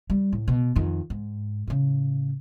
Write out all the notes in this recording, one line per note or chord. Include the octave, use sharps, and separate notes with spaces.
G3
A2
B2
F2 D#3
G#2
A2 C#3